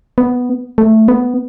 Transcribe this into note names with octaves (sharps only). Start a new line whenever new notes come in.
B3
A3
B3